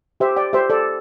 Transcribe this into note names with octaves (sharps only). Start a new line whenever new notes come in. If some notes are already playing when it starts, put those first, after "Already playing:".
G4 C5 E5
D5 G5
G4 C5 E5
A4 D5